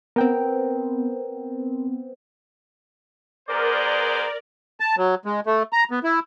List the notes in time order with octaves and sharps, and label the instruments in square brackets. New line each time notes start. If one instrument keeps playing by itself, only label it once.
[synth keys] B3 C4 [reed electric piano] A#4 G5
[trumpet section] B3 G#4 C5 [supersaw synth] A#4 D5
[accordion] A5
F#3
G#3
A3
A#5
B3
E4